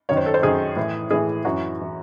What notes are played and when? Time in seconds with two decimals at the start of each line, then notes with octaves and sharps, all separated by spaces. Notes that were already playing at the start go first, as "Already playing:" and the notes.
0.09 F#2 D#3 C#5
0.17 C5
0.26 A4
0.34 C5
0.42 F#2 D#3 G#4
0.76 A2 E3
1.11 A2 E3 G#4
1.45 F#2 E3 F#4
1.81 E3